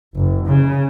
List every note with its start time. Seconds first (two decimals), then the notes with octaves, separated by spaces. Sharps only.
0.15 F#1
0.46 C#3